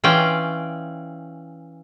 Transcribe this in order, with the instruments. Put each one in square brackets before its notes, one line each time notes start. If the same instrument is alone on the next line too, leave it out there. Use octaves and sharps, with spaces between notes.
[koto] E3 C#4 F4 D5 G5